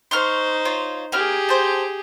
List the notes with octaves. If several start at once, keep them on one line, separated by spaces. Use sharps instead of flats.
D#4 C5 C6 C#6 F6
F4 C#5
A#3 G4 G#4 F6
C5 A5